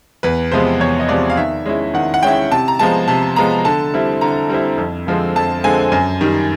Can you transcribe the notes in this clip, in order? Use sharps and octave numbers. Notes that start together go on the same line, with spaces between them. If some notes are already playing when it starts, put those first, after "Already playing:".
E2 B4
C3 F3 G#3 B3 C5
E2 C#5
D#5
C3 F3 G#3 B3 D5
F5
D#3 E5
G#3 C#4 E4
D#3 F#5
F#5
G#3 C#4 E4 G5
C3 A5
A#5
F3 G#3 B3 A5
C3 A5
F3 G#3 B3 A#5
D3 A5
G3 C4 E4
D3 A#5
G3 C4 E4
F2
D3 F3 G#3 C4
F2 A5
D3 F3 G#3 C4 G#5
F#2
D#3 G3